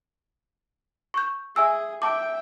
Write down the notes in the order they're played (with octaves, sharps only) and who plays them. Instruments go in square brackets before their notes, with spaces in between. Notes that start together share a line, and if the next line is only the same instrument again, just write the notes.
[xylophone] C#6 G6
[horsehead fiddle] G#4 [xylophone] E5 G#5 E6
[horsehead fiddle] E5 G5 [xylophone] A5 D6